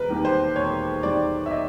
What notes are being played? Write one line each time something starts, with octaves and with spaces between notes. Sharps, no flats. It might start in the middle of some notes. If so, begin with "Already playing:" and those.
Already playing: E1 A#4 B4
D#2 D#3 G3
C5
E1 C#5
D#2 D#3 G3 D5
E5
D#5